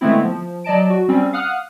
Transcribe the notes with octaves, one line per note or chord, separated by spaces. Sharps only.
D3 G#3 A3 B3 C4 E4
F3
F#3 D5 D#5 A5 D7
F#4
G3 C4 C#4
F5 F#5 D#6 F6 F#6